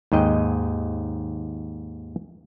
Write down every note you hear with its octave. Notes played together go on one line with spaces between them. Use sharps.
D#2 G#2 D#5 G5